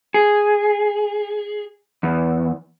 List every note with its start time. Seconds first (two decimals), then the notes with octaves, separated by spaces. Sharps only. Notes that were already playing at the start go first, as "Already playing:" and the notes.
0.14 G#4
2.03 E2